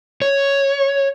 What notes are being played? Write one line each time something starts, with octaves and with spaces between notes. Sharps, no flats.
C#5